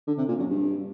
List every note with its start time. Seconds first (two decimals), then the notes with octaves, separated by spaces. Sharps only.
0.07 D3
0.17 C3
0.28 A#2
0.39 F#2
0.49 G2